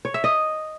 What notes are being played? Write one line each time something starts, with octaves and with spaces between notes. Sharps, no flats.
C#5
E5
D#5